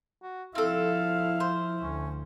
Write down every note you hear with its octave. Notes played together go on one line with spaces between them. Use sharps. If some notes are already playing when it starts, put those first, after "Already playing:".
F#4
F3 C4 E4 A4 F5
C5
D2 C#4